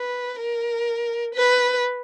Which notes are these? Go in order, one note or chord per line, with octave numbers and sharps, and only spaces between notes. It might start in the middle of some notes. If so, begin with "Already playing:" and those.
Already playing: B4
A#4
B4